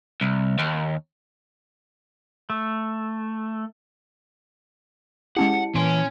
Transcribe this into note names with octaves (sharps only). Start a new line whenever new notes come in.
C2
D#2
A3
G#3 C#4 E4 G4 F#5 A5 C#7
A#2 E3 C#4 C6 D7